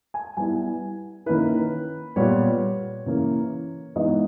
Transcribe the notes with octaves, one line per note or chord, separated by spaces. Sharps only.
G#5
G3 B3 E4 G#5
D#3 A#3 C#4 E4 B4
A#2 G3 B3 C#5
C#3 E3 A#3
E3 G#3 B3 D#4 D#5